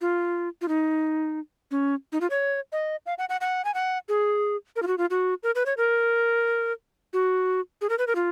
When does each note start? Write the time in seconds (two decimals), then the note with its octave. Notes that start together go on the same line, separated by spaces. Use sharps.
0.01 F4
0.61 F4
0.68 D#4
1.71 C#4
2.12 D#4
2.21 F4
2.30 C#5
2.72 D#5
3.06 F5
3.18 F#5
3.29 F#5
3.41 F#5
3.65 G#5
3.74 F#5
4.09 G#4
4.76 A#4
4.82 F4
4.87 F#4
4.98 F4
5.10 F#4
5.43 A#4
5.55 B4
5.66 C#5
5.77 A#4
7.13 F#4
7.81 G#4
7.89 A#4
7.98 B4
8.07 A#4
8.15 F4